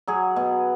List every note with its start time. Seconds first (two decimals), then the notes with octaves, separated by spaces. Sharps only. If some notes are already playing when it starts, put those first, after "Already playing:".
0.08 F#3 G#4
0.36 B2